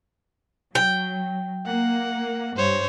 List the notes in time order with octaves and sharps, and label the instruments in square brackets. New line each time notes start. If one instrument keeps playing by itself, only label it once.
[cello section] F#3 [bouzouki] G5
[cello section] A#3 [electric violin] F#5
[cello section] G2 [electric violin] C5 C#5